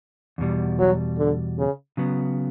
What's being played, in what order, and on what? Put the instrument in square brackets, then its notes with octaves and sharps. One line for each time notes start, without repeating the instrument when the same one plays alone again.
[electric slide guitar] E2 B2 G3
[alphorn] F#3
D3
C#3
[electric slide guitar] C#3 F#3 B3